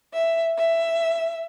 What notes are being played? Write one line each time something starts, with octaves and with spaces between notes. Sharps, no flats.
E5
E5